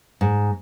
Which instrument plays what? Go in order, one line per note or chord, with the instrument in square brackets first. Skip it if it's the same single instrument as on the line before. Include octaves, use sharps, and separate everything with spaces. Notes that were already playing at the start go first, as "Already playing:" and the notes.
[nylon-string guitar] G#2